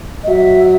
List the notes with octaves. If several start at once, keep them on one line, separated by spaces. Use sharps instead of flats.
D#5
F#3 E5